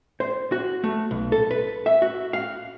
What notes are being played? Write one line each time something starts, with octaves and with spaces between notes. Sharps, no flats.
C5
F#4
A3
B1
A4
B4
E5
F#4
F5